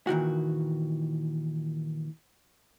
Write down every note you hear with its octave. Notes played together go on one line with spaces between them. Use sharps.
A#2 D#3 E3 F#4